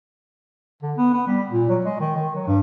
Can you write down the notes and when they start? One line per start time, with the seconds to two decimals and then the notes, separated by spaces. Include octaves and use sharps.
0.82 D3
0.97 B3
1.13 B3
1.27 G3
1.50 A#2
1.69 F#3
1.85 G#3
2.00 D#3
2.16 D#3
2.35 F#3
2.47 G2